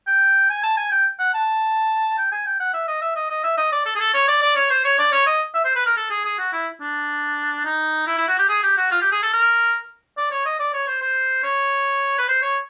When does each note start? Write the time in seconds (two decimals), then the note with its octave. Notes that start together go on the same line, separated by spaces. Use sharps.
0.07 G5
0.50 G#5
0.63 A5
0.77 G#5
0.92 G5
1.19 F#5
1.34 A5
2.18 G5
2.32 G#5
2.46 G5
2.60 F#5
2.74 E5
2.88 D#5
3.02 E5
3.16 D#5
3.30 D#5
3.44 E5
3.58 D#5
3.72 D5
3.86 A4
3.95 G#4
4.00 A4
4.14 C#5
4.28 D5
4.42 D5
4.56 C#5
4.70 C5
4.85 C#5
4.99 D5
5.12 C#5
5.27 D#5
5.54 E5
5.65 C5
5.76 B4
5.86 A#4
5.97 A4
6.10 G#4
6.25 G#4
6.39 F#4
6.53 E4
6.81 D4
7.65 D#4
8.07 E4
8.18 E4
8.28 F#4
8.39 G4
8.49 G#4
8.63 G4
8.77 F#4
8.92 F4
9.01 G4
9.12 G#4
9.23 A4
9.33 A#4
10.18 D5
10.32 C#5
10.46 D#5
10.60 D5
10.74 C#5
10.87 C5
11.01 C5
11.43 C#5
12.18 B4
12.28 C5
12.42 C#5